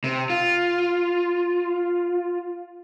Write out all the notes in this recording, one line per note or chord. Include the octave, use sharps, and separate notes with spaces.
C3
F4